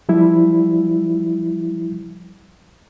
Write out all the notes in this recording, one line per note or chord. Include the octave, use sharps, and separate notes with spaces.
F3 G3 E4